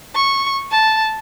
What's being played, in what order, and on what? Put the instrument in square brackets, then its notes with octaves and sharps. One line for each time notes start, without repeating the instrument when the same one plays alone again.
[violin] C#6
A5